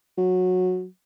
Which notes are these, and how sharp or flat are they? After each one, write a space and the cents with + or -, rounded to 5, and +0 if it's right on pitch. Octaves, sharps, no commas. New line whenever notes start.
F#3 -15